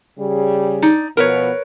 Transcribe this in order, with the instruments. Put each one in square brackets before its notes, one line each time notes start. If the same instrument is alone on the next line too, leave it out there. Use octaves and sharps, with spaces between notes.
[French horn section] C#3 G3 G#4
[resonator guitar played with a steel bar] D#4 D5
[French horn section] B2 F3 B3 [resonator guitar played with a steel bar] A#4 B4 C#5